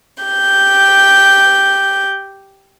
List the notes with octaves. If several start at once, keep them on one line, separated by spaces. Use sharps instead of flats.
G4 G6